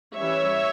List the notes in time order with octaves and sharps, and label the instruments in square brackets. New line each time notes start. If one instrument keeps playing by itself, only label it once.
[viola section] E3 G3 C#4 C#5 E5